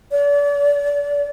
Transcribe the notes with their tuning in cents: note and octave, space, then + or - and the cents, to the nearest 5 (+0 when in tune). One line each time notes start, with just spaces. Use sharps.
D5 -35